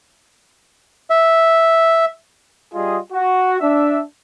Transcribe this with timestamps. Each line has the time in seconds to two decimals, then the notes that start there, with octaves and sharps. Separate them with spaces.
1.10 E5
2.74 G3 F4 G#4 D#5
3.12 F#4
3.60 D4 E5